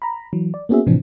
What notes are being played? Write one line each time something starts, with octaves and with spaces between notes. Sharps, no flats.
A#5 B5
E3 F#3
D5
A#3 B3 C#4 F#4 G#4 E5
A2 C3 E3 F3 C4 D4